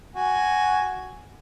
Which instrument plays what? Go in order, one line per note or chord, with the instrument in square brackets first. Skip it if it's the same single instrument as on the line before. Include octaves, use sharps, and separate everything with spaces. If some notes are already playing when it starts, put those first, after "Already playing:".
[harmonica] F#4 G#5